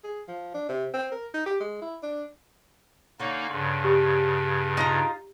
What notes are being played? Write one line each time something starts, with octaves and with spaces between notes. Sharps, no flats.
G#4
F3
D4
C3
C4
A#4
D#4
G4
G#3
E4
D4
D3 A#3 C#4 D#4
G2 C#3 C6
G4
D#4 F4 A#5